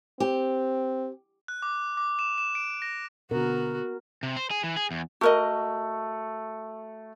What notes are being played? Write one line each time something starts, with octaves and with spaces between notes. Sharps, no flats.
C4 G4
F#6
D6
D6
E7
E7
D7
A#6
B2 D3 B3 F#4 A#4
C3
C5
G#4
E3
G#4
E2
A3 F#4 A#4 D#5